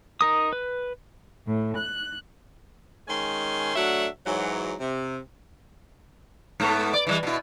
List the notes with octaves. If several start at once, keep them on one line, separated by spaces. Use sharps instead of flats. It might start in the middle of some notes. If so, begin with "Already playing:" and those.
D#4 A#4 D#6
B4
A2
F#6
D#3 G#3 C#4 G#5 C6
F#3 A3 D4 E5 F#5
G#2 E3 F#3
C3
G#2 A3 B3
D5
E3 F3 G3
B2 E4